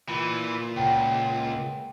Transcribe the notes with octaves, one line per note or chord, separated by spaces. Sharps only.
A#2 E3
C#2 F#5 G5